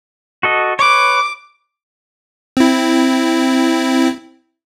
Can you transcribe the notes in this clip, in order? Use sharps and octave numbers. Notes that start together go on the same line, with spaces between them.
F#4 A4 D#5
B4 C#5 D6
C4 E4